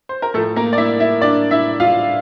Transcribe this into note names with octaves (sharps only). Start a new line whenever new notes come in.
C5
A#4
A2 F3 A3 A4
A#3 A#4
D5
E4 E5
E4 E5
D4 D5
E4 E5
F4 F5